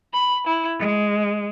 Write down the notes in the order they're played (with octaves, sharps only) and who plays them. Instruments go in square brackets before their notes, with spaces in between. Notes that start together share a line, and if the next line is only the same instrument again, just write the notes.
[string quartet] B5
E4
G#3